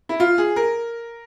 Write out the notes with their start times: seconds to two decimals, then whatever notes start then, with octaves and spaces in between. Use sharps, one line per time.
0.09 E4
0.20 F4
0.38 G#4
0.56 A#4